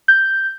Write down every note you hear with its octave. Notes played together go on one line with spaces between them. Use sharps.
G6